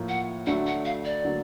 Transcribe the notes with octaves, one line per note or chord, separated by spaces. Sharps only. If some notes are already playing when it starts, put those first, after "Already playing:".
Already playing: A2 F3 A#3
F#5
D2 D3 F#3 A3 D4 F#5
F#5
F5
D5
D3 F#3 A#3